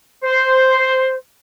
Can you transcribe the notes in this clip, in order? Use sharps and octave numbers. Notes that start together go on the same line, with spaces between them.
C5